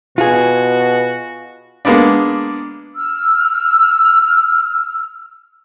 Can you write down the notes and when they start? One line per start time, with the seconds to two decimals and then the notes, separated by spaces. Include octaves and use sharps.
0.18 B2 F4 F#4 G#4
1.85 G#3 A#3 B3 D4
2.95 E6 F6